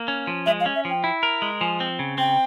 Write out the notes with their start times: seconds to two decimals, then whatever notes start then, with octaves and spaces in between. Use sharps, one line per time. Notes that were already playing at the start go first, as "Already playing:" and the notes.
Already playing: A#3
0.08 C#4
0.27 F3
0.46 G#3 E5
0.60 F5
0.66 C#4
0.75 E5
0.85 F3 G5
1.04 E4
1.23 A#4
1.42 G#3
1.61 F3 G#5
1.80 C4
1.99 C#3
2.18 C4 G5